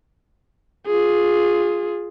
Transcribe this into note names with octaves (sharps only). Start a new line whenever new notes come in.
F4 G#4